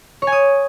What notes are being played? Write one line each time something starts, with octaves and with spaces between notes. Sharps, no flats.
C#5
G#5
D#6